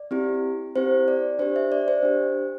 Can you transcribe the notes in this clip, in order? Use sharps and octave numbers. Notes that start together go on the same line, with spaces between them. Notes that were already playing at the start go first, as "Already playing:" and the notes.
Already playing: D5
C4 E4 G4
C4 E4 G4 C5
D5
D4 G4 C5
E5
D5
C5
D4 G4